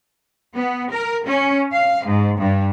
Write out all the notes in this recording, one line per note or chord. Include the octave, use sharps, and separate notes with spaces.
B3
A#4
C#4
F5
G#2
G2